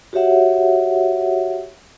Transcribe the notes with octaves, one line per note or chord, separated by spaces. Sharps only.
F#4 G4 C#5 E5 F#5